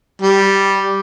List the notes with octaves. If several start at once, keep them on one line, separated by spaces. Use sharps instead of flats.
G3